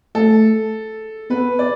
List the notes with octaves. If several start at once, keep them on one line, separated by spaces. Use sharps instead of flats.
A3 A4
B3 B4
D5